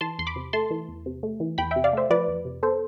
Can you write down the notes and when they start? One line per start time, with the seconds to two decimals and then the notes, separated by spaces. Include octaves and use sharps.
0.01 E3 A5 C6
0.19 E2 C6
0.27 B5 D6
0.36 C3
0.53 A3 A5 C6
0.70 E3
0.89 E2
1.06 C3
1.23 A3
1.40 E3
1.58 E2 G5 B5
1.71 E5 G5
1.76 C3
1.84 D5 F5
1.93 A3 C5 E5
2.10 F3 B4 D5
2.28 F2
2.45 C3
2.63 B3 A4 C5